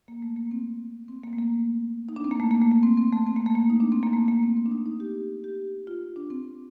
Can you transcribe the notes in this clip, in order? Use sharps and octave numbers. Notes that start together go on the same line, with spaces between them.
A#3
A3
A#3
C4
C4
A#3
A3
A#3
D#4
D4
C4
A#3
A3
A#3
A3
A#3
C4
C4
A3
C4
A#3
A3
A#3
D#4
D4
C4
A#3
A3
A#3
C4
C4
D4
D#4
D#4
G4
G4
F4
D4
C4